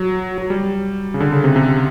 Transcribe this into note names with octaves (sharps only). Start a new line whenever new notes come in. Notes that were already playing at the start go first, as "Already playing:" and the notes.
Already playing: F#3
F#3
G3
C#3
D3
C#3
C3
C3